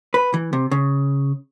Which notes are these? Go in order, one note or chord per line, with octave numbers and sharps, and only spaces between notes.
B4
E3
C3
C#3